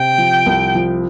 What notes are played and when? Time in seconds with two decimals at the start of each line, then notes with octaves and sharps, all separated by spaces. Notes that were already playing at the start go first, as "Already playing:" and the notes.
Already playing: C3 G5
0.18 F3
0.46 C2
0.75 F3